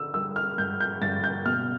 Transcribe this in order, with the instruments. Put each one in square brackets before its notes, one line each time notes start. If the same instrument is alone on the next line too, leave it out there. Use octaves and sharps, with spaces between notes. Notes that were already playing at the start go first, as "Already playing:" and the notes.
Already playing: [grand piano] D3 E6
G3 E6
F6
G2 G6
G6
G2 A6
G6
B2 F6